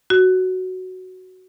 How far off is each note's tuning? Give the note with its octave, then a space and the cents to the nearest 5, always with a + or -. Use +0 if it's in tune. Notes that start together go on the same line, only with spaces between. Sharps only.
F#4 +5